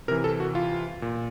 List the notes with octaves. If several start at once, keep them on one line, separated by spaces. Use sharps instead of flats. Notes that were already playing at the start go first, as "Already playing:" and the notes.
C3 E3 A#4
A4
F#4
F4
A#2